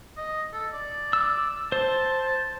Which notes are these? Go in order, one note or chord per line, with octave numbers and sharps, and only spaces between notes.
D#5
A4
D5
E6
C5 A5